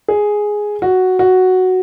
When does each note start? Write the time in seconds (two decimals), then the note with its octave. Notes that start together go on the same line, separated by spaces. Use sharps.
0.08 G#4
0.82 F#4
1.19 F#4